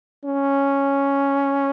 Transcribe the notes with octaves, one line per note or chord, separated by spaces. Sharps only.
C#4